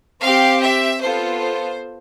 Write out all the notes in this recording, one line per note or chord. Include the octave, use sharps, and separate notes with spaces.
C4 G4 F5
E5
B3 F4 A4 C5
C5